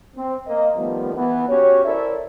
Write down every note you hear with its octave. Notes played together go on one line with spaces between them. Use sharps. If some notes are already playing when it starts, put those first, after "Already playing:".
C4
A#3 D#5
D#3 F3 G3 A3 B3
E3 B3
C#4 F#4 G4 C#5
E4 A4 A#4 C5 D5 E5